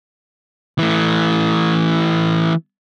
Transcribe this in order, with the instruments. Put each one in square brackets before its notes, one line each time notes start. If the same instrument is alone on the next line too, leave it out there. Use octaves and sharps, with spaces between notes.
[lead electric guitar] E3 A3